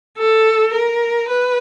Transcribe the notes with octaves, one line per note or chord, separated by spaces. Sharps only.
A4
A#4
B4